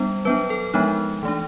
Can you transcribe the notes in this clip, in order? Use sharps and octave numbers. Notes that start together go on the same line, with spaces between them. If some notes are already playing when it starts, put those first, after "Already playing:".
Already playing: G3 B3 D4 C5
F#3 B3 D4 B4
A4
F3 G#3 B3 D4 D#4
E3 A3 D4